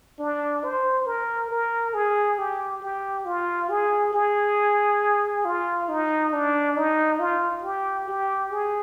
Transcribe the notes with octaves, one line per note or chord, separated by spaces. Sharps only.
D4
C5
A#4
A#4
G#4
G4
G4
F4
G#4
G#4
F4
D#4
D4
D#4
F4
G4
G4
G#4